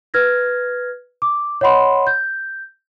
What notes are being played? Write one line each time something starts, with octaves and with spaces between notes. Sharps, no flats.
B4 F6 G#6 A#6
D6
C#5 D#5 F#5 B5 C6
G6